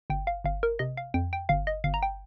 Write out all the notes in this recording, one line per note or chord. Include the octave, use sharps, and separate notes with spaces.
G1 G5
F5
G1 F5
A#4
C3 D#5
F5
F2 G5
G5
G1 F5
D#5
G1 F5
A#5
G5